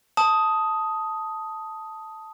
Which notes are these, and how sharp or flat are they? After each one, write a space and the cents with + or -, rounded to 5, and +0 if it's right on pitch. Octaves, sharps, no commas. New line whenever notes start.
A5 +0 D#6 +10